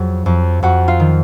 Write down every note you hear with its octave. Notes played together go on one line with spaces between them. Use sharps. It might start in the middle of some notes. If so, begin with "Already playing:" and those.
Already playing: F2 F#3 G#4
F2
F2 F#4 F#5
F4 F5
D#3